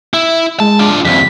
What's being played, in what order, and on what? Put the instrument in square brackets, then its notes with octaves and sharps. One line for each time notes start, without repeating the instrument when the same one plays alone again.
[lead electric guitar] E4
[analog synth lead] G#3 [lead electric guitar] A5
[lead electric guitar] D4 F4
[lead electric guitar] C2 F2 [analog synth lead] B6